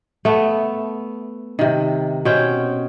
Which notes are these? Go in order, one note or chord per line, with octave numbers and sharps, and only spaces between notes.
A3 B3
C3 D#3
B2 C4 C#4 G5